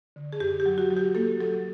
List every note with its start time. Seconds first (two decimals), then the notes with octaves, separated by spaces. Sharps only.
0.16 D3
0.33 G#4
0.40 F#2 G4
0.60 G4
0.66 F#3
0.78 F#4
0.90 F#3
0.96 G4
1.15 A#3 A4
1.40 F#3 A4